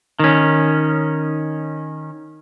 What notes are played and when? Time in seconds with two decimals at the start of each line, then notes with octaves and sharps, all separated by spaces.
0.20 D#3 C#4